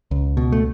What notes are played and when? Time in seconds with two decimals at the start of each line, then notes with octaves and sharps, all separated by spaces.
0.11 C#2
0.37 B2
0.52 A3